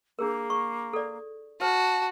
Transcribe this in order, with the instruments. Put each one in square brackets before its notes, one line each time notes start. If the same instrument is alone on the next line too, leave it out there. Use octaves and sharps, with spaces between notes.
[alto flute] A#3 [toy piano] D4 G#4 A#4
[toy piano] C#6
A4 D5
[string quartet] F#4 [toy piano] C5 [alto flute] A5